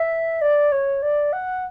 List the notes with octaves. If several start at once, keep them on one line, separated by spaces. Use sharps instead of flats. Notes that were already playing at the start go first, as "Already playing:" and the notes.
Already playing: E5
D5
C#5
D5
F#5